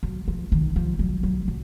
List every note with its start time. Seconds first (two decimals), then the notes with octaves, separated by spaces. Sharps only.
0.03 F#3
0.28 F3
0.52 D#3
0.76 F3
0.99 F#3
1.23 F#3
1.48 F#3